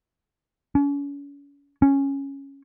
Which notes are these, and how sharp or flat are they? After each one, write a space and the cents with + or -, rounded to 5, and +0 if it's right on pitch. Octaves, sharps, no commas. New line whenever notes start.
C#4 +40
C#4 -5